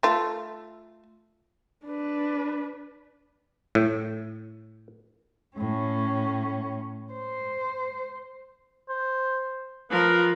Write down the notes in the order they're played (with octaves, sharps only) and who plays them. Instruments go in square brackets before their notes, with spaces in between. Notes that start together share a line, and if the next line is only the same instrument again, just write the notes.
[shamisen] A3 F4
[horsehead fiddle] D4 B4
[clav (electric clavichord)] A2
[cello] A2 C#4
C5
[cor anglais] C5
[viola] F3 A#4 [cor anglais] B4